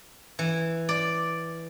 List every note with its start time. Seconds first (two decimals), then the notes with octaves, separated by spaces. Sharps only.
0.39 E3
0.89 D5